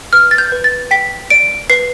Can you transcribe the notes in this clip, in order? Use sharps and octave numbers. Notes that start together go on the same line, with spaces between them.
B4 F6
A6
G6
B4
A6
G5 B6
D5 D7
B4 C7